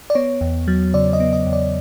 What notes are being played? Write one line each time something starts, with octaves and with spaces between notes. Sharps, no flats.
D5
B3 C#5
E2
F#3
C#3 D5
D#5
B3
D#5
E2
D5